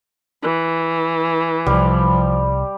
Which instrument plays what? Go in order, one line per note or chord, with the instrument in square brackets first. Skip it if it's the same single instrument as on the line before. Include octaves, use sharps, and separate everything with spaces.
[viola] E3
[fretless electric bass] C2 [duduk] F3 [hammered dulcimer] G3